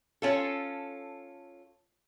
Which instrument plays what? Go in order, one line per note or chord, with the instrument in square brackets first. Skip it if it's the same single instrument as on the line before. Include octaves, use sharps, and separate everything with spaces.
[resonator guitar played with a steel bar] C#4 F4 A4